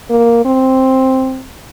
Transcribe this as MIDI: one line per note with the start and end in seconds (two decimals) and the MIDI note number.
0.10 0.43 58
0.45 1.44 60